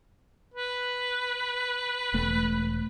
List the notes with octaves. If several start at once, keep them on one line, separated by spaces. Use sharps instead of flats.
B4
E1 A3